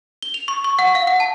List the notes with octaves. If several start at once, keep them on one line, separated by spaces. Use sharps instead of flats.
G7
F7
C#6
C#6
F#5
F5
F#5
A5